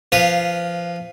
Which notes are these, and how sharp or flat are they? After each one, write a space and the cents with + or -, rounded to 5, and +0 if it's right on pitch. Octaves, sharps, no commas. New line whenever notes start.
F3 -20 B4 +0 F5 +0